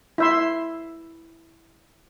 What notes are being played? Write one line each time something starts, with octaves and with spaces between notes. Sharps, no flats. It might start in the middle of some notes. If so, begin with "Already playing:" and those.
E4 E5 C6